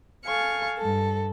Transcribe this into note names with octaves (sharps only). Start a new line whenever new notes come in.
A4 F5 G#5 C#6
G2 A4